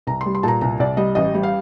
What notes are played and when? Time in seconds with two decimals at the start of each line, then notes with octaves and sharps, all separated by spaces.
0.07 C2 A#5
0.21 C6
0.26 G3
0.35 C6
0.43 A#2 A5 A#5
0.61 C2 A#5
0.79 C2 D5
0.97 G3 D#5
1.15 A1 D#5
1.34 G3
1.43 F5